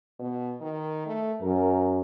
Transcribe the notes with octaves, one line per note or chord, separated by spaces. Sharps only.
B2
D#3
A3
F#2 A#4